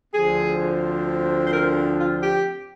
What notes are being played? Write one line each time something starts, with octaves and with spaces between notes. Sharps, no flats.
D2 D3 F3 C4 G#4
C5
A#4
F4
G4